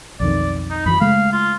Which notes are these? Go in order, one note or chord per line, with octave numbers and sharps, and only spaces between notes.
B1 F2 D#3 D5
D#4
F#2 E3 F#3 B5
C#3 G#3 A3 F5
F4